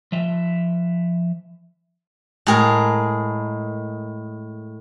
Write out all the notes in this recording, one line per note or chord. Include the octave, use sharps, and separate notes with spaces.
F3 E5
A2 G#3 G#4 A#4